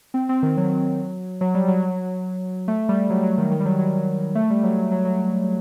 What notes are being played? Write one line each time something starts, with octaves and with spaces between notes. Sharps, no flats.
C4
C4
D#3
F#3
F#3
G3
F#3
F#3
A3
G3
F#3
F#3
D#3
D#3
G3
F#3
F#3
A3
G3
F#3
F#3
F#3
F#3